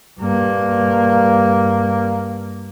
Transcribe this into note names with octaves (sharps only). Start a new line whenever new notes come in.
G2 A#3